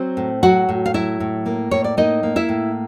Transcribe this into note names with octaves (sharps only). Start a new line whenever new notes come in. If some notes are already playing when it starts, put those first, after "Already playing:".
Already playing: F#3 C4 C5
A2
F#3 F#4 F#5
A2
F5
F#3 E4 E5
A2
A#3
A2 C#5
D5
A#3 D#4 D#5
A#3
E4 E5
A2